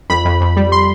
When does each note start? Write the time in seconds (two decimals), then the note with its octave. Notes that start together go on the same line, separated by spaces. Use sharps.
0.10 F2 B5
0.25 F2
0.41 F2
0.56 G3
0.72 C6